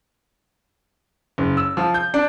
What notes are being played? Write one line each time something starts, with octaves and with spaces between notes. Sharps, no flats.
F#1
E6
F3
G6
D4